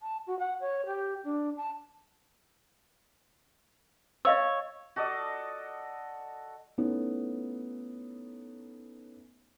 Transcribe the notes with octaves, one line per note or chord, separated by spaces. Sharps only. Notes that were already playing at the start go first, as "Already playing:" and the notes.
A5
F#4
F#5
C#5
G4
D4
A5
C#5 D#5 F5 E6
F#4 A4 D5 D#5
A3 B3 C#4 D#4 E4